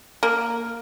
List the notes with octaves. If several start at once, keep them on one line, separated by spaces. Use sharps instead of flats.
A#3